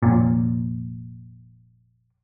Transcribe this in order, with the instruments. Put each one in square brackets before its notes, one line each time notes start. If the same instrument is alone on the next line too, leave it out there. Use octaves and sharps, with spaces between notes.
[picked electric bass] F1 A#2